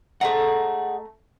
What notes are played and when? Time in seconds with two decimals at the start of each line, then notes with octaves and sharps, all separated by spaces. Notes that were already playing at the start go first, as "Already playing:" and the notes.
0.21 A3 G#4 D#5 F#5 A#5